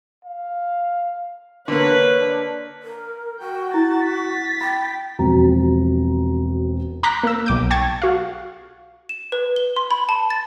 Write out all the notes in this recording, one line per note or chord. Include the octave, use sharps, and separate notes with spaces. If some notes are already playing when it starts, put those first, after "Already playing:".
F5
D3 A#3 B4 C#5
D4
A#4
F#4 G5
E4 A6
A6 B6
G5 B5
E1 F3 F#3 C4 F#4 A#5
A#5 D6 F#6 G6 A#6 B6
A#3 E6
B1 D6 G6
G5 A5 C#6 G#6 A6
F#4 F5
E7
B4
G7
C6
B5
A5
A6